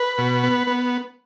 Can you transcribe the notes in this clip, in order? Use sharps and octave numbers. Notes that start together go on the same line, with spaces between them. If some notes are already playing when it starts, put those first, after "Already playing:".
Already playing: B4
B2
B3
B3